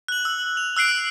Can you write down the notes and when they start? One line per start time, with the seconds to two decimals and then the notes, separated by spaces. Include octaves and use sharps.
0.08 F#6 F#7
0.25 E6
0.57 F7
0.76 E6 F#6 C7 D7